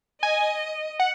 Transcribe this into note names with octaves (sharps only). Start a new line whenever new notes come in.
D#5 G#5
F#5